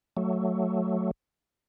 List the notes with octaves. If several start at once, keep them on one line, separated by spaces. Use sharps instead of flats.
F#3 A3